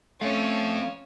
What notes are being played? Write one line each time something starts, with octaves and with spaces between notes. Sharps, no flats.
A3 C4 C#4 F5